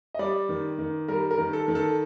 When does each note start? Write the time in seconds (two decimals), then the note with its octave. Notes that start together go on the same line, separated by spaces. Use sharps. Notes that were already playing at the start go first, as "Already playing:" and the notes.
0.14 D#5
0.19 G3 D5
0.49 D#3
0.79 D#3
1.08 G3 A#4
1.31 A#4
1.38 D#3
1.53 A4
1.68 D#3
1.75 A4